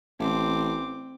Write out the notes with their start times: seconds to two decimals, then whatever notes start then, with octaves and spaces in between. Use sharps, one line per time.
0.19 A1 C4 D6